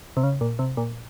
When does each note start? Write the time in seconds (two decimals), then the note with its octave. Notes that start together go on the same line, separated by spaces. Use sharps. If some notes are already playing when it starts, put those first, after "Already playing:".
0.17 C3
0.23 C#3
0.41 A#2
0.59 C3
0.77 A#2